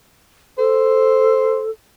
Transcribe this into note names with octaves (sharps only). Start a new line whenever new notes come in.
A4 C5